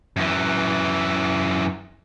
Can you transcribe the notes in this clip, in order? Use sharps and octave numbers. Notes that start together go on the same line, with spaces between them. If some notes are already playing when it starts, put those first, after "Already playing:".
F#2 E3